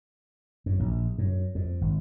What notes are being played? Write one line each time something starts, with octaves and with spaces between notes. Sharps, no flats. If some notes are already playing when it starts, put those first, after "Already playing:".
F#2
A#1
F#2
F2
G#1